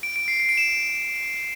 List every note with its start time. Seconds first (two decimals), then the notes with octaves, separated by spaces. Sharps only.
0.03 D7
0.16 D7
0.28 C7
0.40 C7
0.49 D7
0.57 E7